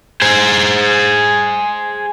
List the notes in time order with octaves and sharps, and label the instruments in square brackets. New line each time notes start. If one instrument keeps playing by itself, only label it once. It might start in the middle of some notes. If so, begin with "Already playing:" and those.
[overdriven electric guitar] G#4 C5